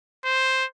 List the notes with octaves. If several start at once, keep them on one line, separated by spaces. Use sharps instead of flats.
C5